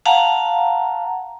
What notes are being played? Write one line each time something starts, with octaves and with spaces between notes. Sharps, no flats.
F5 F#5 A5 A#5